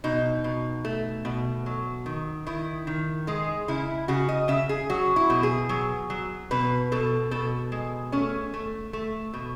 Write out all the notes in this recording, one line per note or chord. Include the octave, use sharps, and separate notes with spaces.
B2 D#4
B2
A3
B2
F#3
D#3
D#3 E4
D#3
G#3 G#4
C#3 E4
C#3 F#4
D#5
C#3 E5
G#4
F#3 F#4
E4
B2
G#4
F#3
F#3
B2 B4
B2 A4
B2 A4
G#3
A3 C#4
A3
A3
B2